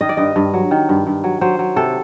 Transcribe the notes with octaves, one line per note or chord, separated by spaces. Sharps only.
D#3 D#5
D5
G2 D#5
G2
F#3
D#3
G2
G2
F#3
F#3 C5
F#3
C3 A4